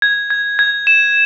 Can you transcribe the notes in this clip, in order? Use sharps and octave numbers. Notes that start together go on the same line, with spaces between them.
G#6
G#6
G#6
E7